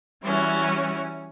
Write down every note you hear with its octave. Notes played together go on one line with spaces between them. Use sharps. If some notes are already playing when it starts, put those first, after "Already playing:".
E3 G3 C#4 E4 F#4